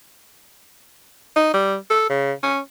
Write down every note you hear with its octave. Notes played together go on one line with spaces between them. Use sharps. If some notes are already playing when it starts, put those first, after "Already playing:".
D#4
G3
A4
C#3
C#4